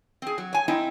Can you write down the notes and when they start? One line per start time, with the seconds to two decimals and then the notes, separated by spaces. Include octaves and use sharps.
0.22 C4 G#4
0.38 F#3
0.53 C#5 G#5
0.68 C4 D#4 E4